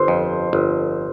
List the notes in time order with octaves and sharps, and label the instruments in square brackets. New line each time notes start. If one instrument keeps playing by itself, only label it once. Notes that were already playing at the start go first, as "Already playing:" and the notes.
Already playing: [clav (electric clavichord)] G1 [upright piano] C5 C6
[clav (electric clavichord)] F2
G1